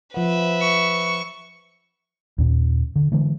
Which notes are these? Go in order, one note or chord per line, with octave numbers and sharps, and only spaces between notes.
F3 B4 E5 F#5
C#6
D#2 A#2
D3
D3 E3 G#3